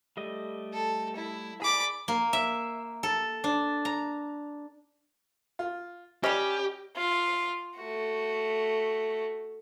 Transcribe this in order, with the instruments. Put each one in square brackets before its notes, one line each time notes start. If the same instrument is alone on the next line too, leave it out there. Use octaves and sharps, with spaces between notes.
[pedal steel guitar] G3 A3 D#5
[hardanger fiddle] A4
E4
[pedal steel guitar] G#4 D5 [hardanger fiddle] B5 D6
[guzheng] A#3
E5
A4
D4
A#5
[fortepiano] F4
[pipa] G3 C#4 [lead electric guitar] G4 [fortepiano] D#5
[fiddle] F4
A3 F#4